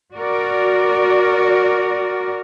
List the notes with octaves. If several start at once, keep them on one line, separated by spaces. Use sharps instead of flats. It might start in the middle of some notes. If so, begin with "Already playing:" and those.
F#4 A#4 D5